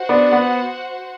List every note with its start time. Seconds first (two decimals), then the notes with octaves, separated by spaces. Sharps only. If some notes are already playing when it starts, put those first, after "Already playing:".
Already playing: F#4 C5 F#5
0.09 B3 D4
0.32 B3